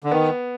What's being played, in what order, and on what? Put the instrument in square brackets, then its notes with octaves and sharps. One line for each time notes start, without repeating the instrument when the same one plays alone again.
[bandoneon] D3
[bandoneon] D#3 [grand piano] B3